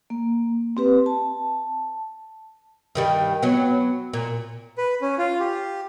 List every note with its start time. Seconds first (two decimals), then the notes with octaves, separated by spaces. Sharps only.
0.10 A#3
0.77 C4 G4 B4
1.06 A5
2.95 G2 D#3 G3
3.43 F#3 B3
4.13 A#2
4.78 B4
5.02 C#4
5.18 F4
5.39 G4